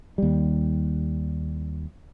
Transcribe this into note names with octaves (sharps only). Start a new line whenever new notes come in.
D#2 G3